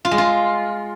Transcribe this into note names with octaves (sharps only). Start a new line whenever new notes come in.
F4
G#3
F4